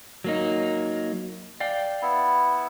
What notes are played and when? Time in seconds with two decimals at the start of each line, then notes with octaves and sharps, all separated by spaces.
0.24 F#3 A#3 D#4
1.60 D5 F5 G5
2.02 B3 E4